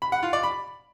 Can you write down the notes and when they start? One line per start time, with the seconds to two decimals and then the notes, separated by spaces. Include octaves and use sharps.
0.02 B5
0.12 F#5
0.23 F4
0.33 D5
0.43 B5